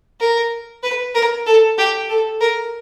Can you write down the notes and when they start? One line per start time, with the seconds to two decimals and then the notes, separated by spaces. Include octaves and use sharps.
0.20 A#4
0.83 B4
1.14 A#4
1.46 A4
1.78 G4
2.09 A4
2.41 A#4